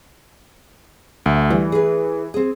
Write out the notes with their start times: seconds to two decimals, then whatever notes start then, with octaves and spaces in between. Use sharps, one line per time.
1.26 D2 A3
1.50 E3 G3
1.72 G#4 B4
2.34 C4 G#4